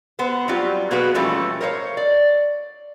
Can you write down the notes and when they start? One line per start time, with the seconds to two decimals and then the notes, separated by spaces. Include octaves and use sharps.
0.19 B3 C5
0.48 F#3 G3 C4 F4 G4
0.91 B2 A#3 B3 F#4 G#4 B4
1.14 B2 E3 F3 G3 A3 C#4
1.61 A#4 C5 C#5 E5 F5
1.97 D5